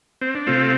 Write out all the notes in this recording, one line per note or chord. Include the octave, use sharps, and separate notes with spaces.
C4
D4
C3 A3 C4 F4